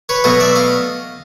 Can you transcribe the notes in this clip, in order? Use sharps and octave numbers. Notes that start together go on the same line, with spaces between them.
B4 C#5
B2 F#3 A3 C#5 D#5
D5 E5
D#5 F5